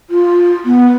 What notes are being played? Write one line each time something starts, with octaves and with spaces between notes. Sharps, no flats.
F4
B3